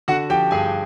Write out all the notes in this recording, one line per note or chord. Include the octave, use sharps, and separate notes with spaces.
D3 F#4 F#5
F3 G4 G5
G2 G#4 G#5